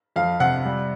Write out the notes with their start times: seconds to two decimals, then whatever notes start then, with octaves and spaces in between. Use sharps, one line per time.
0.16 F2 F5
0.40 C3 F#5
0.65 G3